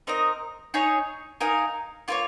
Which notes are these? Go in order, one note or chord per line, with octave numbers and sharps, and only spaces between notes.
C4 D#4 A#4 D#5
D#4 G#4 C#5
D#4 A#4 F5 G#5
A#3 F4 A#4 C#5